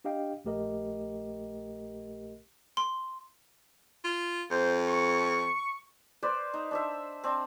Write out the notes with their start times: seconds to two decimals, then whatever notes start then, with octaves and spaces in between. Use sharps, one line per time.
0.04 D4 G4 D#5 F5 G5
0.45 A#1 A3 G4 A#4 D#5
2.77 C6
4.04 F4
4.51 F2 C5
4.88 C#6
6.23 B4 C5 D5
6.54 D#4
6.71 D4 C5 E5
7.24 C4 D4